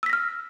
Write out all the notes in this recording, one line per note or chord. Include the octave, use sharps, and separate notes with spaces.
E6 F6 A#6 B6